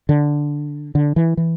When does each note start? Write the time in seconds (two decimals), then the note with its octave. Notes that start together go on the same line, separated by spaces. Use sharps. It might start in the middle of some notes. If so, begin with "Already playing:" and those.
0.09 D3
0.95 D3
1.16 E3
1.37 E3